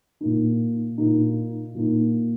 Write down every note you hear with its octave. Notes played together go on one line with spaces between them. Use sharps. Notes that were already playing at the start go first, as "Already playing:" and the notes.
A#2 A#3 D#4
A#2 A#3 D#4
A#2 A#3 D#4